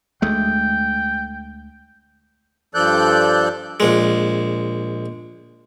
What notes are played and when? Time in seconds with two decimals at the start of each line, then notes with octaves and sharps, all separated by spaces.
0.22 D2 G#3 A3 G5
2.75 G2 F3 A4 D5 F#6 G6
3.80 A#1 G#3